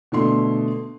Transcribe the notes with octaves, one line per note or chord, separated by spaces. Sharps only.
B2 D3 A3 C6